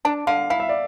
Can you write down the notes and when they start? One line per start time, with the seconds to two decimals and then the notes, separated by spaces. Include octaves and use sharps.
0.05 D4 A5
0.27 D3 F5
0.50 E4 F5
0.60 E5
0.69 D5